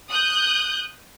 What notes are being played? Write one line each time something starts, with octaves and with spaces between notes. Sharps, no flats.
D#6 F#6 G6